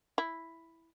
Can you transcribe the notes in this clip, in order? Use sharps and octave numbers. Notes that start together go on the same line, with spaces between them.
E4